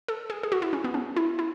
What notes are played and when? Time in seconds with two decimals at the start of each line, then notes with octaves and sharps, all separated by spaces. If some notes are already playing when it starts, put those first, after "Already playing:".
0.08 A4
0.30 G#4
0.43 G#4
0.52 F#4
0.62 E4
0.73 C#4
0.84 B3
0.94 C#4
1.16 E4
1.39 E4